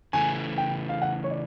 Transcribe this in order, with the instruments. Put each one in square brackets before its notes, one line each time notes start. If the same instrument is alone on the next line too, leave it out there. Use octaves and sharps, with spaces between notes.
[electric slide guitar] C#3 E3 A3 [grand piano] G#5
[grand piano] G5
F5
F#5
C#5
D5